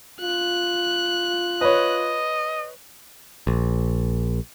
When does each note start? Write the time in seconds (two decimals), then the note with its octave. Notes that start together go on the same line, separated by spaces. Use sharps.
0.21 F4 F#6
1.61 B4 C#5 D#5
3.47 A#1